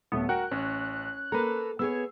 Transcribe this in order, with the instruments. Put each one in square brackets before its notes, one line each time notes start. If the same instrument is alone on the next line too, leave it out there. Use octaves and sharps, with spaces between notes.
[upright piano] D#1 A3 D#6 [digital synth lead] B3
[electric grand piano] F#4 A#4 F#5 [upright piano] G5 [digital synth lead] F#6
[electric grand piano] A1 [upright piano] C#4
[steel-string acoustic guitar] A#3 A4 [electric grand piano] B4 A#5
[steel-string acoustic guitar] B3 G#4 C#5 [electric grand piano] E6